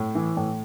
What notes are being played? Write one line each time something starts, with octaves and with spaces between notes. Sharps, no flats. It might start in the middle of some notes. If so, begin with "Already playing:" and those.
Already playing: A2
E3
A2